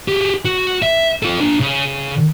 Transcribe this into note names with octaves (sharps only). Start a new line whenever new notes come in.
G4 G#4
F#4
E5
F4 A4
D4 F4
C#3